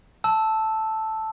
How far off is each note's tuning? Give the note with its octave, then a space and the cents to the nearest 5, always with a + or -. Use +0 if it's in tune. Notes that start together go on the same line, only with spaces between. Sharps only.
A5 +0 E6 -5